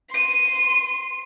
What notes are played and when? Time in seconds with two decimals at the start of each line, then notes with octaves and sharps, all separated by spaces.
0.10 C6 D#7